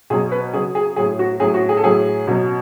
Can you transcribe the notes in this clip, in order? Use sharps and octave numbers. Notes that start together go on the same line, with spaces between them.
B2 F#3 G#4
B4
C#3 F#3 G#4
G#4
A2 F#3 G#4
F#4
A2 F#3 G#4
F#4
G#4
A4
A2 F#3 G#4
B2 F#3